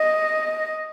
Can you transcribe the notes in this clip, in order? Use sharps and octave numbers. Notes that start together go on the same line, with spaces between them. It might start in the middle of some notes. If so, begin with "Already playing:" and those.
Already playing: D#5